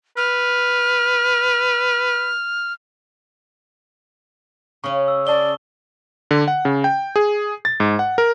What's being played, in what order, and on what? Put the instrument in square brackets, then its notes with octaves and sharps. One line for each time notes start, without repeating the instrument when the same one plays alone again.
[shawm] B4 [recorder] F6
[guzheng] C#3 C#4 [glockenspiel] C#6
[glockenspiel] E6
[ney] D5 [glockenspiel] A5 D#6 G7
[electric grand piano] D3
F#5
C#3
G5
G#4
A6
G#2
F#5
A#4